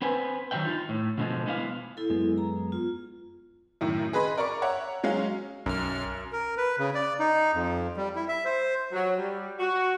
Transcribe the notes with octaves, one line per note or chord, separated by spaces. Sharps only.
C4 B4 G#5
D#3 F#3 A3 C#5 E5 G5
D#4 F4
A2
B2 D3 F3 G3 G#3
G#3 B3 E4 C5 F5
E4 A4
F#2 G#3 B3
A#5
F4
F#2 A2 D#3
G#4 B4 D#5 B5 C6
A#4 D5 A#5 C#6 D6
C#5 E5 F#5 A#5
F#3 G#3 C#4 F5
B1 F#2 F6
A#4
B4
C#3
D5
D#4
F2
G3
E4
E5
C5
F#3
G3
F#4